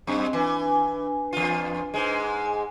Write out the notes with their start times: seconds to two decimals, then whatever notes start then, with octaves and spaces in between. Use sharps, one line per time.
0.07 F#2 C4 D#5
0.33 E3 D4 B4 G#5
1.33 E2 F4
1.94 G#2 G#3
2.46 G#5